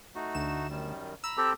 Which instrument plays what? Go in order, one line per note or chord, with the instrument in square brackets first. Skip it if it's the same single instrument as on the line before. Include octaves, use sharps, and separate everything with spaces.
[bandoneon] A3 D#4 F#4
[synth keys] D2 E7
[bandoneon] F#2 D#3 G3
[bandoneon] A#5 B5 [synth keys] E6
[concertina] C4 G4 A4